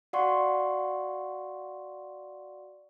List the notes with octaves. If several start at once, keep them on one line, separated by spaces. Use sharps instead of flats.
F#4 D5 F5 F#5 C6 C#6